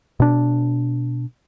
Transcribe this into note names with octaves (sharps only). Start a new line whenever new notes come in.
B2 D4